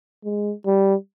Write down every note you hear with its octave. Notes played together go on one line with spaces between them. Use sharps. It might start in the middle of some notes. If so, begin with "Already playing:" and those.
G#3
G3